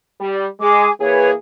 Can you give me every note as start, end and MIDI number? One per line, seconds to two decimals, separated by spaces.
0.21 0.47 55
0.60 0.88 56
0.60 0.90 68
0.60 0.90 86
1.00 1.33 52
1.00 1.33 58
1.00 1.33 68
1.00 1.29 71
1.00 1.29 73